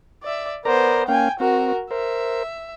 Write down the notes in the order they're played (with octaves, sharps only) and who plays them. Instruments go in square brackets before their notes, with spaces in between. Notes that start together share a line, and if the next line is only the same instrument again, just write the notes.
[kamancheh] D5 E5
[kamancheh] B3 C5 [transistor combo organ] A#4 D5 A#5
[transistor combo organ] A#3 C#4 F5 [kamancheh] G5 G#5
[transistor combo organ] C4 [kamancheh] F#4 A#4
[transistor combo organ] A#4 C5 [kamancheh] E5